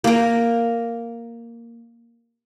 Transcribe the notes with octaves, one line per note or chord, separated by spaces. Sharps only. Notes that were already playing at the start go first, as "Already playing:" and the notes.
A#3 A#4